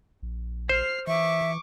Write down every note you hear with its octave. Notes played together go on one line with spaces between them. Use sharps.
A#1
C5 F6 C7
E3 E5 C#6 D6